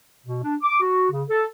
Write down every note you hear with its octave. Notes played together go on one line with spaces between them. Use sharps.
B2
D4
D6
F#4
C#3
A4